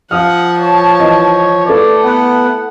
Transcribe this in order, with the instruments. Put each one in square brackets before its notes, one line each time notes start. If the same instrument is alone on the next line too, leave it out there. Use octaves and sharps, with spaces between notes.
[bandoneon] F3 [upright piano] F5 D#6 F6 [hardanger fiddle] F#5
[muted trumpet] C#5 [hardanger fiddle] A5
[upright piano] E3 D#5
[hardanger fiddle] A3 E4 [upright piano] A4 B4 [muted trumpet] D5
[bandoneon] B3 [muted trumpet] F#5